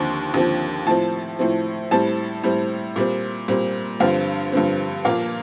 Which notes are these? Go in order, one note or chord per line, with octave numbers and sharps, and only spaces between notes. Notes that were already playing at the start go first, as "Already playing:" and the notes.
Already playing: D#2 D3 F3 C4 C6
D#2 D3 F3 C4
A2 F3 C4 A5
A2 F3 C4
A2 G3 C4 A5
A2 G3 C4
A#2 G3 C4
A#2 G3 C4
G2 D3 F3 C4 F5
G2 D3 F3 C4
A#2 F3 A#3 F5